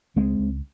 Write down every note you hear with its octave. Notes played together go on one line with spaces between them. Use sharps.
C#2 G#3 C4
C#2